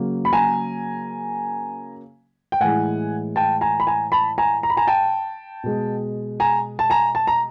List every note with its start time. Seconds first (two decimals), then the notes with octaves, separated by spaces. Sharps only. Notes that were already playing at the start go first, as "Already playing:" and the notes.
Already playing: C#3 F#3 A#3
0.25 B5
0.33 G#5 A#5
2.52 G5
2.60 A2 E3 G#3 F#5 G#5
3.36 G5 A5
3.61 G#5 A#5
3.80 B5
3.87 G#5 A#5
4.12 A5 B5
4.38 G#5 A#5
4.63 A#5
4.70 B5
4.77 G#5 A#5
4.87 G5 A5
5.64 B2 G#3
6.40 G#5 A#5
6.79 A5
6.90 G#5 A#5
7.15 A5
7.27 A#5